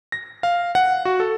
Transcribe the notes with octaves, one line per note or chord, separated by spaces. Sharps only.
A#6
F5
F#5
F#4
A4